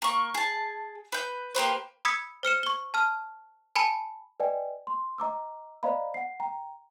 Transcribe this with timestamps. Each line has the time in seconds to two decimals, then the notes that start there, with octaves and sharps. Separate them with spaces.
0.02 A#3 C#6
0.34 G#4 A5
1.12 B4 G6
1.55 A#3 G4 B4 C5
2.05 B5 D#6 E6 G#6 B6 C#7
2.43 C5 F6 C#7 E7
2.63 C#6 G7
2.94 A5 F6
3.76 G#5 A5 B5 C#7 D#7
4.40 B4 D5 D#5 G5 G#5
4.87 C6
5.18 D#5 A#5 D6 E6
5.83 C5 D5 D#5 F5 A#5 B5
6.14 F#5 C7
6.40 G5 A#5